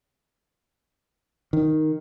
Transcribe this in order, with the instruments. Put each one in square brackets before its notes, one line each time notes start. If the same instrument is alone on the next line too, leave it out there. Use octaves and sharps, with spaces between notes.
[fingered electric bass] D#3